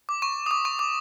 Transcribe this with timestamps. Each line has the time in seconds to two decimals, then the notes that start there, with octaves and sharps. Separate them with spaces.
0.09 D6
0.22 C#6
0.46 D#6
0.51 D6
0.65 C#6
0.79 D6